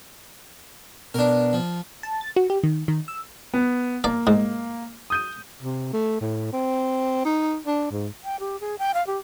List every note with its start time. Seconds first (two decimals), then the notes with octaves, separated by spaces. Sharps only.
1.14 B2 B3 D4 A#4
1.53 F3
2.03 A5
2.21 A6
2.36 F#4
2.50 G4
2.63 D#3
2.88 D#3
3.08 E6
3.54 B3
4.04 A#3 D5
4.27 G#2
5.10 D#6 G6 D#7
5.63 C3
5.93 A3
6.21 A2
6.52 C4
7.25 D#4
7.66 D4
7.91 G#2
8.24 G5
8.40 G4
8.60 G#4
8.79 G5
8.94 F5
9.07 G4